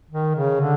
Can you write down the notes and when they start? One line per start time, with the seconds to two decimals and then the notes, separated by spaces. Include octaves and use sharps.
0.10 D#3
0.35 C#3
0.61 D3